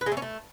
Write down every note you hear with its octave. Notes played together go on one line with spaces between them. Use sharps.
B4
G#3
A3
C#4
A3